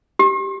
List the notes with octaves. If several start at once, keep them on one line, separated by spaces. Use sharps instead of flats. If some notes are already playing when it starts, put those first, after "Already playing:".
G4